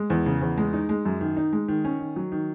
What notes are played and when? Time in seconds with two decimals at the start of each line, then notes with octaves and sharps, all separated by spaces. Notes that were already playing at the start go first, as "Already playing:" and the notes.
Already playing: G#3
0.10 E2
0.26 C#3
0.41 E2
0.57 G#3
0.73 D#4
0.89 G#3
1.05 F#2
1.21 D#3
1.37 D#4
1.53 G#3
1.68 D#3
1.85 C#4
2.00 D#3
2.16 F#3
2.32 D#3